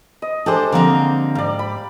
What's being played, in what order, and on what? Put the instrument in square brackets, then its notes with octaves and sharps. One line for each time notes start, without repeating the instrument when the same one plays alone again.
[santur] D#5
[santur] G#3 G4 A4 [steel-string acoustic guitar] D4 C5
[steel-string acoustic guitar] D3 F3 C4 [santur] A#3 A#5
[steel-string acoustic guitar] G#2 [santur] D5 F5
[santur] B5